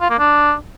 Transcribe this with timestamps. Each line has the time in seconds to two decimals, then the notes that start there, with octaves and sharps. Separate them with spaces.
0.01 F4
0.10 A#3
0.19 D4